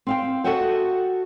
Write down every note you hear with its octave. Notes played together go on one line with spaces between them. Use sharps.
C4 F5 G5
F#4 A4 D#5 E5 F#5 G5